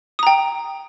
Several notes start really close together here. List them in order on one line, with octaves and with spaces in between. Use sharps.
D#6 A#5 G5